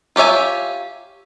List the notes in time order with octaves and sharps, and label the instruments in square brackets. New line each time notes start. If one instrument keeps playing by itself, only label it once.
[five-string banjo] F4 G4 C#5 E5 G#5